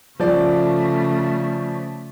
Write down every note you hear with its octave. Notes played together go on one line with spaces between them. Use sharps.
C#3 F3 A3 D5